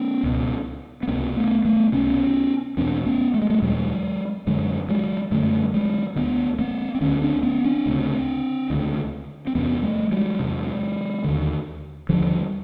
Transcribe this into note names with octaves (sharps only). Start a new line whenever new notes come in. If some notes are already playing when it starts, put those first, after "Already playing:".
Already playing: B3 C#4
C#2 B2
B3
C#2 C3 A#3 C4
A3 B3
A3 B3
C#2 C3 B3 C#4
E2 B2 C4 D4
B3 C#4
A3
G#3
G3 A3
E2 B2 F#3 G#3
F#2 D3 F#3 G#3
F#3 G#3
F#2 D3 G3 A3
F#3 G#3
D2 D3 A3 B3
A#3 C4
C4
D2 D3 B3 C#4
C4 D4
B3 C#4
C4 D4
D2 C#3
D2 C#3
C4
E2 C3 B3 C#4
G3 A3
F#3 G#3
E2 C3
D#2 D3
D#2 D3 F3 G3